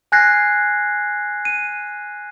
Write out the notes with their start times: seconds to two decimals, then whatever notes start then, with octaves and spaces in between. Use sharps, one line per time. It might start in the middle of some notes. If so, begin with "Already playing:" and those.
0.12 G#5 F6 F#6 G#6 A#6 C7
1.45 D#7